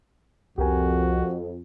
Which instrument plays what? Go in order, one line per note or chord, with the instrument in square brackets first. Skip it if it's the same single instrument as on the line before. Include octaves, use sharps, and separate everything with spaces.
[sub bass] C2 [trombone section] F2 [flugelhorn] F#4 [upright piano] G4 A#4 G#5